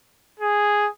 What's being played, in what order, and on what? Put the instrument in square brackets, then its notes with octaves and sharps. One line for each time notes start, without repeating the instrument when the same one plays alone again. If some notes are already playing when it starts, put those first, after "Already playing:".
[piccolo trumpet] G#4